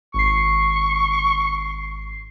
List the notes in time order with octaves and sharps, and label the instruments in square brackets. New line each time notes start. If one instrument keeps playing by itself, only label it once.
[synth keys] G#1 C7 [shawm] C#6